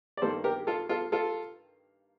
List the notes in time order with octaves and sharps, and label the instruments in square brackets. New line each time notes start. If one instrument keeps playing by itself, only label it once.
[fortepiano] D5
G2 D#3 G3 A#3 A4 C5
G4 A#4
F4 A4
F4 A4
F4 A4